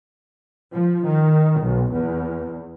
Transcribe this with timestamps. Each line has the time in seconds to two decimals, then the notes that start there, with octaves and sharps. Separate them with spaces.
0.73 F3
1.05 D#3
1.60 B1
1.93 E2